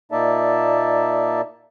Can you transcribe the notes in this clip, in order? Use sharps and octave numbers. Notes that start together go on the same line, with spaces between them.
A#2 A#3 D#4 D5 E5 A5